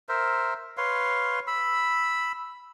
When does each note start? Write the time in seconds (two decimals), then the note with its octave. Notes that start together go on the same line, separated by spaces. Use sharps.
0.09 A#4 C5 E5
0.77 B4 C#5 F5 C6
1.47 B5 E6